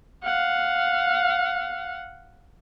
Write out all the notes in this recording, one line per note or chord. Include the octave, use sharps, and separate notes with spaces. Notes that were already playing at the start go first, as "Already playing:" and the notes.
F5 F#5